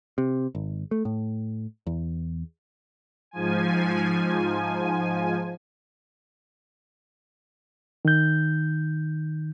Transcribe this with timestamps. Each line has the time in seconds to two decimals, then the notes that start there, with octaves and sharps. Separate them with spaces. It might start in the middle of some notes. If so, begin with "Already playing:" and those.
0.18 C3
0.55 G#1
0.91 A3
1.05 A2
1.87 E2
3.31 G#2 F3 G#5
8.05 D#3 G6